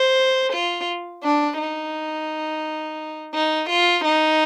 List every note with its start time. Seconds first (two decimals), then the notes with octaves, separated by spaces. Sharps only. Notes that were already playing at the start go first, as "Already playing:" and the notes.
Already playing: C5
0.53 F4
1.23 D4
1.58 D#4
3.34 D#4
3.69 F4
4.04 D#4